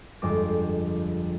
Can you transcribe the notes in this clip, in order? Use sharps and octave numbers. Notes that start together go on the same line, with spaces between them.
G1 F2 G#3 G5 D6 A#6